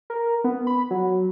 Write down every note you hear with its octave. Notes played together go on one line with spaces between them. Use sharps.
A#4
B3
B5
F#3